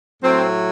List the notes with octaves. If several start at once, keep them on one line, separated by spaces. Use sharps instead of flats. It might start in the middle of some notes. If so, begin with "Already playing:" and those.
A2 F#3 A3 C4